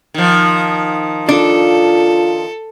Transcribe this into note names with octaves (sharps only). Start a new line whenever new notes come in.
D#3 F3
D4 F4 A4